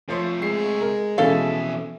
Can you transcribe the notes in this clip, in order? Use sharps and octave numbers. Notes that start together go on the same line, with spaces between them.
C3 F3 A3 C5 C#5
G#3 C7
A#4
F2 B2 E3 C#4 A4 E5 F5